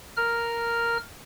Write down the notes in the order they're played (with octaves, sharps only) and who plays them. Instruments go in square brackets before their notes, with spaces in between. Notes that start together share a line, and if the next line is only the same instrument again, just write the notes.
[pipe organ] A#4 F6